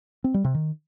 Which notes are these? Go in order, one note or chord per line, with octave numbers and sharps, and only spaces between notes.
C4
G3
C3
D#3